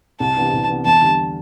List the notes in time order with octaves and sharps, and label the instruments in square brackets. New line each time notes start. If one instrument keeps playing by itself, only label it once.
[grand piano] C2 [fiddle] A5
[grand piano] C3 E3 B3 D4
C2
C3 E3 B3 D4
[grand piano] E2 [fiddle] A5
[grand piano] D3 G3 D4